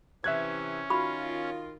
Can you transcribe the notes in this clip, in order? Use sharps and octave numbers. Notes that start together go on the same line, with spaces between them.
C3 E3 C#4 E5 F#6 G#6
D#3 F4 F#4 B5 C#6